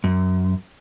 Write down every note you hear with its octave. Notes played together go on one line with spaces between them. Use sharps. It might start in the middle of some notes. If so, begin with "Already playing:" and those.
F#2